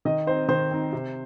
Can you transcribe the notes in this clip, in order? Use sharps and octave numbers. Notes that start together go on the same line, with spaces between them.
D#3 D#5
C4 D#4 C5
D#3 C5
C4 D#4
C3